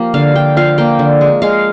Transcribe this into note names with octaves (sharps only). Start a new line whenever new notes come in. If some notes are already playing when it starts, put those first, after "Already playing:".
Already playing: F3 A#3 G4 A#4
D3 F5
D3 G5
F3 F5
A#3 G5
D3
G#3
G#3 F5